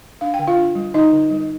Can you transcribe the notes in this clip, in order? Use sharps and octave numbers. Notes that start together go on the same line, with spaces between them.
D4 F5
G5
D3
F4 F5
D4
G3
D3 D#4 D#5
D3
G3